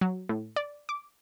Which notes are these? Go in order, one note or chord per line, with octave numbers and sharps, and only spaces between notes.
F#3
A2
D5
D6